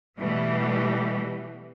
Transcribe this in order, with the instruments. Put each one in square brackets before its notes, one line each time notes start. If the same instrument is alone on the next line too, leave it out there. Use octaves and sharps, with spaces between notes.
[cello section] B2 E3 G3 A3